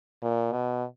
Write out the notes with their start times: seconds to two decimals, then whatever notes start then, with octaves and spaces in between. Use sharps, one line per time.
0.23 A#2
0.52 B2